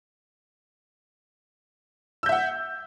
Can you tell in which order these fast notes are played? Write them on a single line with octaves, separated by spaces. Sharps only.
E6 G6 E5 F#5